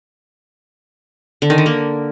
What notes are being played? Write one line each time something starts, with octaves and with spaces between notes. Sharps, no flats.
D3
D#3
D3
A#3